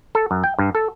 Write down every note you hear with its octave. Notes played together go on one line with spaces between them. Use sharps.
A4
F#2
G5
G2
A4